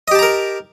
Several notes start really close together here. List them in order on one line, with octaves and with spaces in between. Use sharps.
D#5 G4 A5 A#5 A#4